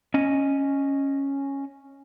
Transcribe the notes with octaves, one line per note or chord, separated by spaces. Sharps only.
C#4 D#5 G#5